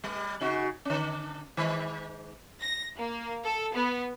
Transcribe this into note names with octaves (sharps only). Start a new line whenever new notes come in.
G3
C#3 D#4 F#4
D3 C#4
D#3 G#3
A#6
A#3
A4
B3